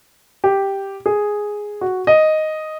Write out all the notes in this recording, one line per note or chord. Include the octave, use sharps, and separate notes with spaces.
G4
G#4
F#4
D#5